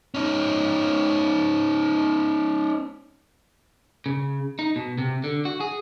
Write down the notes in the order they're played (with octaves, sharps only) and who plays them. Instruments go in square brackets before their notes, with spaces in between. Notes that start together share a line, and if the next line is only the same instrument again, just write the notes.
[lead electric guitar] C#4 D#4
[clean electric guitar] C#3
D#4
B2
C3
D3
F#4
G#4